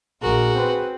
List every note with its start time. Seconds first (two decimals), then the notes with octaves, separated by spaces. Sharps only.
0.22 A#1 F#4 G#4 A#4
0.58 C4 B4